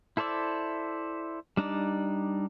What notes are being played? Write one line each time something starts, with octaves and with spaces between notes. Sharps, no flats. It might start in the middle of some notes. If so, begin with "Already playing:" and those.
E4 A4 C5 D5 E5
G3 D4 D#4 D5